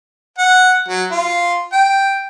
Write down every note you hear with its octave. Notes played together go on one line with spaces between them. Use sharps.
F#5
F#3
F4
G5